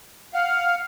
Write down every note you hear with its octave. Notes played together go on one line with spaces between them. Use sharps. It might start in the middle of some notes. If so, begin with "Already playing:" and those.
F5 F#5